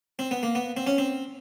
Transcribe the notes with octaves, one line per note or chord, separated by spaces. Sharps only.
C4
B3
A#3
B3
C4
C#4
C4